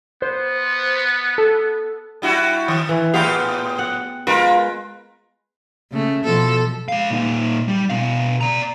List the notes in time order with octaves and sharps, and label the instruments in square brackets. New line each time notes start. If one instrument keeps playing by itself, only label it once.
[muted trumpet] B3 [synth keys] C5
[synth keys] A4
[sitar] G3 E4 F#4
D#3
[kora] E3
[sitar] A2 G4 [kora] B3 G#4 F5
[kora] F#5
[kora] G#3 B4 [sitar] F4 A#4
[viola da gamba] C#3 A3
B2 F3 A4
[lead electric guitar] G#3 F5
A#2 D#4
G3
B2 F5
D5 A#5